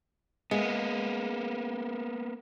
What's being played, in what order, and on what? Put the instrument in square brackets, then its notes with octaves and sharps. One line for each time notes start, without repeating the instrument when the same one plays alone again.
[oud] G#3 [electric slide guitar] A#3 B3